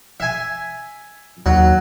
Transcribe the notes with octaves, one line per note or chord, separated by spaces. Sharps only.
E5 G#5
D#2 F#3